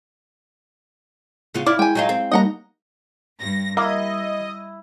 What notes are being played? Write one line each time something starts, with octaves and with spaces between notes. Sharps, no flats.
C#3 B3 F4
E4 D5 D6 F6
G#3 G5 G#5
F#3 D#4 F4
C4
G3 A#3 D#4 D#5 F#5 A#5
G2 A#6
G3 A#3 E4 D#5